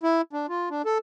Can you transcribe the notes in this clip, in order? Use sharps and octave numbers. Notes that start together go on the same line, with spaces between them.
E4
D4
F4
D4
A4